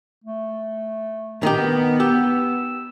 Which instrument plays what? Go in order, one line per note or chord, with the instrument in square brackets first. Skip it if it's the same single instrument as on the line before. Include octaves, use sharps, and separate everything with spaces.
[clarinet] A3
[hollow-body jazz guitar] D#3 D#4 G4 [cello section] B3
[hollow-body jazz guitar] G4 [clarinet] E6